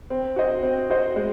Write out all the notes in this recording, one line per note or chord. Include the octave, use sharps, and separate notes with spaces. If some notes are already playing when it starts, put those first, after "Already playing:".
C4
F#4 C5 D#5
C4
F#4 C5 D#5
G#3